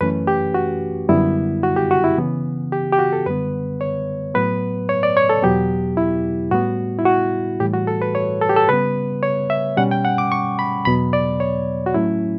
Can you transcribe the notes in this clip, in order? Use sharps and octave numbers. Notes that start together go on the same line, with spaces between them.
F#2 E3 A3 C#4 B4
G4
F#4
F#2 D3 G3 B3 E4
F#4
G4
F#4
E4
C#3 E3 B3
G4
G4
F#4
A4
F#2 D3 G3 B3 B4
C#5
A2 F#3 B3 B4
C#5
D5
C#5
A4
E2 B2 F#3 B3 G4
E4
A2 G3 B3 F#4
E4
F#4
A2 E3 G3 G4
F#4
A4
B4
C#5
A4
G4
A4
C#3 G3 B3 B4
C#5
E5
B2 G3 C#4 F#5
G5
F#5
D6
C#6
B5
E2 B2 F#3 B3 B5
D5
C#5
F#4
A2 F#3 A3 C#4 E4